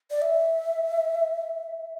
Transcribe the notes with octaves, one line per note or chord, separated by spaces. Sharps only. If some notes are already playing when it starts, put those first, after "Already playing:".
D5
E5